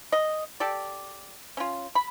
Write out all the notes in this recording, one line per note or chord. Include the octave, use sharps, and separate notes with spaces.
D#5
G4 A4 D5
C#4 F4
B5